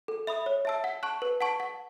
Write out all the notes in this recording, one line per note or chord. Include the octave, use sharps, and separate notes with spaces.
A4
E5 B5 D#6
C#5
E5 A5 E6
F#5
A5 C#6 F#6
B4
F#5 A5 C#6
F#5